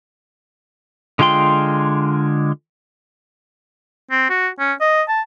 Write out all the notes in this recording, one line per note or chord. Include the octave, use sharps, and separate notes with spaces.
D3 G#3 F4 G5 C6
C4
F#4
C#4
D#5
A5